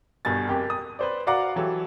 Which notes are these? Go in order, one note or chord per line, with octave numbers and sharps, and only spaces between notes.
G1 G2 B2 G#5 A6
F#1 F2 G4
D#6
B4 C5 D5
F#4 D5 F5 F#5 A#5 D6
E3 F#3 G4 A4